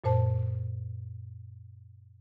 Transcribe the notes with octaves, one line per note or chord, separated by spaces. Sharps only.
F#2 A#2 C5 A5